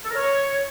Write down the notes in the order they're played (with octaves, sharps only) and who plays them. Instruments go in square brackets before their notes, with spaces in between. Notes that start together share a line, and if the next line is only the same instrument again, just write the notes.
[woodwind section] A4
A#4
C#5